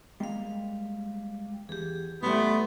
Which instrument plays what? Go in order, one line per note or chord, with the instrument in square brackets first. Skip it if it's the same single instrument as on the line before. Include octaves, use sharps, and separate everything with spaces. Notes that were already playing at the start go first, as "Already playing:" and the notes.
[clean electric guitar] G3 G#3 A#3 [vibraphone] F5 G5
[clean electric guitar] E2 [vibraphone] G4 G#4
[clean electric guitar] A2 E4 [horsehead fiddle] G3 A3 [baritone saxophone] B3 [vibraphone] E5 C6